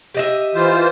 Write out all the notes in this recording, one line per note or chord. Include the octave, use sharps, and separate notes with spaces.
G4 D#5 E5
E3 F4 C5